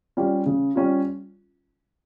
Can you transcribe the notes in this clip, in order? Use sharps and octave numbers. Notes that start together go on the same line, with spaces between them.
G3 C#4 F4
C#3
G3 C#4 F4